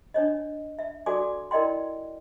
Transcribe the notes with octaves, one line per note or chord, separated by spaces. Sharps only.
D4 C#5 D#5
E5
F#4 A4 D5 G#5 D6
E4 A#4 D5 D#5 G5 C6